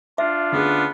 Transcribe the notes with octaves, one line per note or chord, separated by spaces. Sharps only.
D4 F4 E5
D2 B3 C#4 G#4